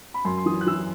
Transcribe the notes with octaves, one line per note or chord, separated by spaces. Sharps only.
B5
F#2 C6
C6
E3 D#6
F#6
E3 E6